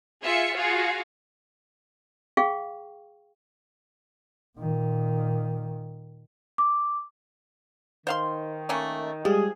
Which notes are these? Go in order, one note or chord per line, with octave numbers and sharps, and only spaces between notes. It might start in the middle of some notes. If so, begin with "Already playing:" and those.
F4 G#4 E5 C#7
F4 F#4 G#4 F5
G#4 F5 G5 C#6
A#2 D#3
D6
D#3 C5 F5 C6
A3 A#3 C#4
F3 G3 G#3 G4 G#4